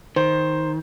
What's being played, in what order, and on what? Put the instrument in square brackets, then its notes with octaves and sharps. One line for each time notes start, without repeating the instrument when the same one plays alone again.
[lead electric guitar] D#3 [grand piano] C5